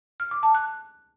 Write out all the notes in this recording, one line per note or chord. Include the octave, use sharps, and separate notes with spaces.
F6
D6
A5
F#6